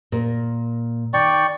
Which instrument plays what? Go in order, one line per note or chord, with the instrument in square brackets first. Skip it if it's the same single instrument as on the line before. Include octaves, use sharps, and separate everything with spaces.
[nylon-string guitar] A#2 A#4
[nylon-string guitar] D#3 [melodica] D5 G5 C#6